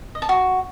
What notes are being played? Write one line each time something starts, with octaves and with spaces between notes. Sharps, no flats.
D#5
A5
F#4